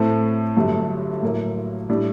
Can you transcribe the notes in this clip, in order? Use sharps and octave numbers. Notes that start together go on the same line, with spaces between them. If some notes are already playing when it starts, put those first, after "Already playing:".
Already playing: A2 A3 C4
G1 G2 F#3 A3
A2 F#3 A#3
A2 G3 D4